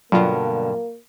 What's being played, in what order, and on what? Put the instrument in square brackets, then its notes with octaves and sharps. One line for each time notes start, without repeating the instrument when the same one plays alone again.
[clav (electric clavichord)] G2 [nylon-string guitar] B2 D3 F#5 [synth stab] F#3 F4 [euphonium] A#3